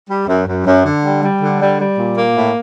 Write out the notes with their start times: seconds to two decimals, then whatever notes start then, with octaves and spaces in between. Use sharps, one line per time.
0.08 G3
0.27 F#2
0.47 F#2
0.66 F#2
0.84 D3
1.04 G3
1.23 G3
1.41 D3
1.61 G3
1.79 G3
1.98 A#2
2.17 A#3
2.36 A2